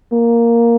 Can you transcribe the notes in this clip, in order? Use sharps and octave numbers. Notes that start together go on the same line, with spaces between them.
A#3